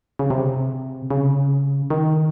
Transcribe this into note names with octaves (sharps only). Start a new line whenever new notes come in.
C#3
C3
C#3
D#3